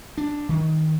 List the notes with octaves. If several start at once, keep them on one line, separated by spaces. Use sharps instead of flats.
D4
D#3